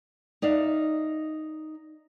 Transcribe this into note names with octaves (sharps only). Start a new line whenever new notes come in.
D#4 D5 E5 F5